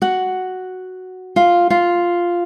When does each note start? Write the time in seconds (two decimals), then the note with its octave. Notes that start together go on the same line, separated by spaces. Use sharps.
0.02 F#4 F#5
1.36 F4 F5
1.70 F4 F5